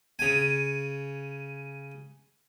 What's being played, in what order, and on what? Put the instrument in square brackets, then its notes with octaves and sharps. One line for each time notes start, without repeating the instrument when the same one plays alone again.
[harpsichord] C#3 G#5